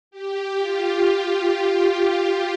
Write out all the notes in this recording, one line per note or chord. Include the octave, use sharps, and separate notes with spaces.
G4
F4